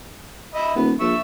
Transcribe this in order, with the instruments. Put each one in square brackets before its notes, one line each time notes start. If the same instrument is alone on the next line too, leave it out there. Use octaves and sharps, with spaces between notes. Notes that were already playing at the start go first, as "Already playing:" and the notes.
[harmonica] D#5 E5 B5
[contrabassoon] D#1 [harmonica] B3
[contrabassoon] A#1 [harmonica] E5 C#6 E6